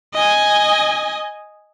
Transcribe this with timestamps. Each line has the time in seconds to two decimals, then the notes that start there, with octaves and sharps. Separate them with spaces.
0.14 D#5 G#5